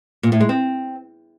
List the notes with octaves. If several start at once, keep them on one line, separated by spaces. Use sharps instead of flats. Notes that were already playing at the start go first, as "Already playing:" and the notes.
A#2
A2
G#3
C4